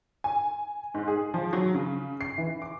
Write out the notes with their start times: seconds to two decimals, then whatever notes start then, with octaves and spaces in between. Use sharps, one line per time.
0.24 G#5
0.94 G#2
1.08 G#4
1.34 F3
1.53 F#3
1.74 C#3
2.21 C7
2.38 E3
2.62 D6